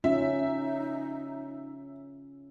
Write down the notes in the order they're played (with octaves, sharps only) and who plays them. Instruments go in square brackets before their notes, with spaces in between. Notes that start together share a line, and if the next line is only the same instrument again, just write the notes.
[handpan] C#4 F4 [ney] D#4 [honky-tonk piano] E5